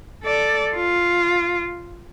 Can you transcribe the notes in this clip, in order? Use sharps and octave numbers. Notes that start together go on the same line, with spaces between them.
A4 D5
F4